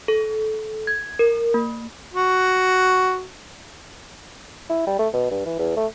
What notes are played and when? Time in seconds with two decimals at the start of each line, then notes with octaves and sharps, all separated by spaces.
0.08 A4
0.87 G#6
1.19 A#4
1.54 A#3
2.14 F#4
4.69 E4
4.87 G3
4.99 A3
5.14 B2
5.31 G2
5.46 E3
5.59 E2
5.76 A3